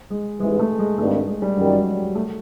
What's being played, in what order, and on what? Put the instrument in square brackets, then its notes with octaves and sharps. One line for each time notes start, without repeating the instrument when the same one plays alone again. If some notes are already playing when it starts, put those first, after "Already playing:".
[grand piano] G#3
[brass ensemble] E3 [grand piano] G#3
[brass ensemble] A1 G#2
[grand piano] A3
G#3
[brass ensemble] G#1 G2 D#3 [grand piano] A3
[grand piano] G#3
G3
[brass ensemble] F#2 D#3 G3 [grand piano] F#3
[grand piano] G#3
A3